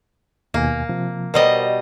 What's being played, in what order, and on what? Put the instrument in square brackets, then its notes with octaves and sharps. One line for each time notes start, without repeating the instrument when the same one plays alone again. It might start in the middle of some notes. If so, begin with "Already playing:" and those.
[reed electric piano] D#2 B2 G#5 [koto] A#3
[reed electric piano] C3 F3
[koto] B2 G3 D#5 [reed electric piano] A#4 C5